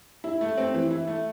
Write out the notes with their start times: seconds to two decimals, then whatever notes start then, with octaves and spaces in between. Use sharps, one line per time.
0.24 E4
0.41 A3
0.57 C4
0.74 E3
0.91 E4
1.08 A3